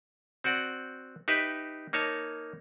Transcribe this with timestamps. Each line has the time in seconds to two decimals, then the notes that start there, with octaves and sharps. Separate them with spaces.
0.44 C4 F#4 D5 F#5
1.28 D#4 G4 B4 E5
1.93 A#3 D#4 C#5 A5